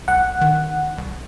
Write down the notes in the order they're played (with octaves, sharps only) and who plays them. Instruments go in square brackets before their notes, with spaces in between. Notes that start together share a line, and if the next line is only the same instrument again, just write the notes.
[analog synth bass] C2 [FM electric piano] F#5
[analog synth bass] D#3
C2